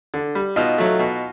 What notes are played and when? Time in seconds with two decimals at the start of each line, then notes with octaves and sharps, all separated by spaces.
0.14 D3
0.35 G3
0.56 B2 D#4 F4
0.78 F#3 A3
0.99 B2